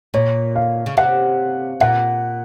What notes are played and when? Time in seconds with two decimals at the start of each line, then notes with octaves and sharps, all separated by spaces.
0.14 A#2 C#5
0.56 F5
0.86 C#3
0.97 C3 F#5
1.80 A#2 F#5